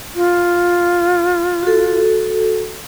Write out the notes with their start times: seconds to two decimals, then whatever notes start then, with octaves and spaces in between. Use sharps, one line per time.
0.15 F4
1.63 F#4 A4